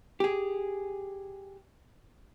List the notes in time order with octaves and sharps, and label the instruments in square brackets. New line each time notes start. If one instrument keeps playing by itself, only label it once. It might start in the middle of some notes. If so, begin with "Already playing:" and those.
[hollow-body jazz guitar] G4 G#4